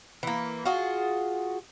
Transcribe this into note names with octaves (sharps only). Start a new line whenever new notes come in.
E3 A#3
F4 F#4 G#4